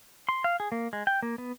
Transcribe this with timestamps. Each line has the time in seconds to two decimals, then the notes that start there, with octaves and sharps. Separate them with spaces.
0.29 C6
0.44 F5
0.60 G#4
0.72 A#3
0.93 G#3
1.07 G5
1.22 A#3
1.38 B3